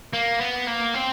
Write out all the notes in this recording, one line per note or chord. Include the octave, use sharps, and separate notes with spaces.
A#3
B3
A#3
C4